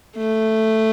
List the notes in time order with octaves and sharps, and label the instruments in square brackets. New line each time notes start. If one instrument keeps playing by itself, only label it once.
[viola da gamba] A3